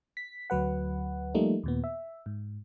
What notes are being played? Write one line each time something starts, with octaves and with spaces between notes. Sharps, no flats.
B6
D2 F#3 B4 F#5
F3 G3 A3 A#3 D#4
D#2 A#2 B3
E5
G#2